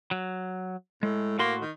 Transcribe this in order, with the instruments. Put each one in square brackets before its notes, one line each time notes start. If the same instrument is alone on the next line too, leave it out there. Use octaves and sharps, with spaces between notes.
[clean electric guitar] F#3
[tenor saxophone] A2 [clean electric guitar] G#3
[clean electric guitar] A2 F#4 C6 [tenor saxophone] A#3
[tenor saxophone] D#3